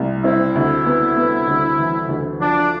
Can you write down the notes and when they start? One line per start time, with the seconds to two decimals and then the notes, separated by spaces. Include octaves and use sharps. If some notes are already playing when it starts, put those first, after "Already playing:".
Already playing: C2
0.23 C4 E4
0.55 D2
0.86 B3
1.16 B3
1.47 D2
1.79 E3
2.08 D2
2.40 F3 D4